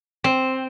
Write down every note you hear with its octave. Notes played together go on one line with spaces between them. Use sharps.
C4